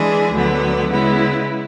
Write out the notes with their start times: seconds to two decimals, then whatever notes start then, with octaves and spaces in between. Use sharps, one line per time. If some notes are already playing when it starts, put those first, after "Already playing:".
Already playing: E3 G#3 D4 G#4
0.33 D2 D3 F#3 B3
0.89 C#3 G#3 B3 E4